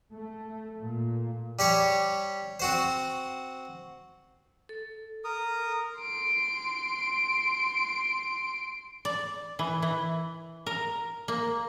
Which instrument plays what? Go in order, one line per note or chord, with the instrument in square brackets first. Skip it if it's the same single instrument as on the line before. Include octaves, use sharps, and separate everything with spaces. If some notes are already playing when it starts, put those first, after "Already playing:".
[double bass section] A3
A#2
[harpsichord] G3 G4 C#5
C4 F#4 C5
[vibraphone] A4
[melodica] A#4 D#6
[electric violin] C6 D7
[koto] D5
E3
E3
A#4
A#3